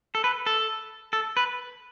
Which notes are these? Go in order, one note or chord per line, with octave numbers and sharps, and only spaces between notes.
A4
B4
A4
A4
B4